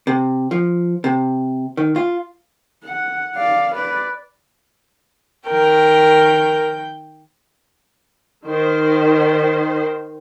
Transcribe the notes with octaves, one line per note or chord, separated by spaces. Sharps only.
C3
F3
C3
D#3
F4
F#5
D5 F5
B4 D5
D#3 A#4 G5 G6
D#3 C5